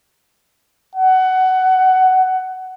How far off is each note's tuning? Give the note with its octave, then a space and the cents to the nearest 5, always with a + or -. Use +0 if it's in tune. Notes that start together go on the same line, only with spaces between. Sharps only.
F#5 +15